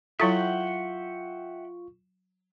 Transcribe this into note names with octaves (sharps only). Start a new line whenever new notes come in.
F#3 E4 F4 A4 E5 F#5 G5 C#6